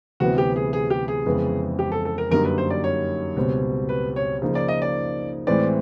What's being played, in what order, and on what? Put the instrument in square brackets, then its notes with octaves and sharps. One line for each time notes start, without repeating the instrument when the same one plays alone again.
[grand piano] D2 C3 E3 G3 B3 [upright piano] F#4
[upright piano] G4
G#4
G#4
G4
G#4
[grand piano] F2 C#3 E3 G#3 B3
[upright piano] G4
A4
A4
A#4
[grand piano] F#2 D3 G3 A#3 D#4 [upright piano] A#4
[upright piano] B4
C5
D5
C#5
[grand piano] C#2 B2 G3 C4
[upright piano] B4
C#5
[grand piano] C#3 F3 A#3 D#4
[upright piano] D5
D#5
D5
[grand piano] A2 E3 G#3 C4 [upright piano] D5